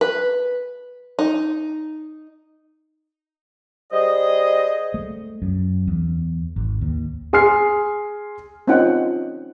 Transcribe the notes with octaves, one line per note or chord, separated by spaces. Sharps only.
B4
D#4
G3 G#4 C5 D#5
A3
F#2
E2
G#1
D#2
G#4 G#5 C6 F6 C7
C4 C#4 D#4 F4 F#5 G5